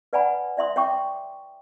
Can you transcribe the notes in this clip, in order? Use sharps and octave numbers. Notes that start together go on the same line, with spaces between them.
B4 D5 F#5 G#5 A5 B5
D5 E5 C6 D#6
C#5 E5 G5 A5 C#6 D6